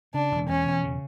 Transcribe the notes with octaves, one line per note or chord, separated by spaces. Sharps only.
C#3 D4
E1
E2 C#4
E1
C#3